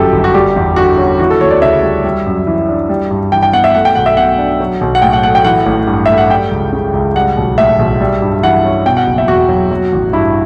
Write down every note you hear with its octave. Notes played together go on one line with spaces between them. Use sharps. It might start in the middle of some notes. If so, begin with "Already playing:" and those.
Already playing: G1 F#2 E3 G4 A4
G1
F#4
G3 G4
E2
D3 F#4
C#4
E3 F#4
A4
D2 C#5
D5
C#3 E5
G3
G3
F#2
E3
D4
G3
G2
E3 G5
G5
B3 F#5
E5
A3 F#5
G5
B1 F#5
E5
B2 F#5
D4
F#3
B1
F#5
A2 G5
F#5
A3 F#5
G5
E3 F#5
A1
G2
A3 E5
F#5
G3 G5
C#2
C#3
C#2
G3 F#5
B1
A2 E5
B1
G3
G2
E3 F#5
C#4
B2 G5
F#5
F#1
E5
E2 F#4
F#3
F#3
A1
G2 E4